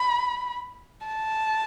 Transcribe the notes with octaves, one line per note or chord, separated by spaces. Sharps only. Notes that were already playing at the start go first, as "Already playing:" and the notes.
Already playing: B5
A5